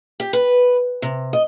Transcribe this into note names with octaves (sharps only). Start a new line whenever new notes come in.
G4
B4
C3
D#5